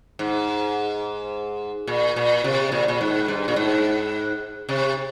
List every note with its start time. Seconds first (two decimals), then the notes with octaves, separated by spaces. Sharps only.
0.19 G#2
1.87 A#2
2.16 A#2
2.44 C3
2.72 A#2
2.88 A#2
3.01 G#2
3.28 G2
3.48 A#2
3.56 G#2
4.69 C3